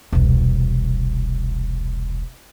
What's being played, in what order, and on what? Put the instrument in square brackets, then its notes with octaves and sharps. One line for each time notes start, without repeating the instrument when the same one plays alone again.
[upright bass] E1 C2